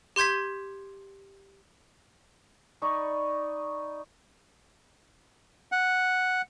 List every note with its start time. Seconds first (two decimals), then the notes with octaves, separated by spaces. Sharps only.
0.16 G4 C6 G6 G#6 B6
2.82 D#4 D5 B5 C#6
5.72 F#5